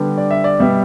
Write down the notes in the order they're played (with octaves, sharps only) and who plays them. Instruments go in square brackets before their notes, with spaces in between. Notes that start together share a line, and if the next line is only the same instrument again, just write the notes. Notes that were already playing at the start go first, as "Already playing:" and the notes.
Already playing: [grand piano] D3 G3 B3
D5
E5
D5
B2 G3 B3 E5